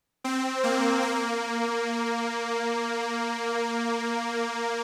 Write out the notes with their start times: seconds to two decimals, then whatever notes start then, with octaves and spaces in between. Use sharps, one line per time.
0.24 C4
0.64 A#3
1.03 A#3